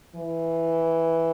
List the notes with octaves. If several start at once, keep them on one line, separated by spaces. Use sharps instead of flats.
E3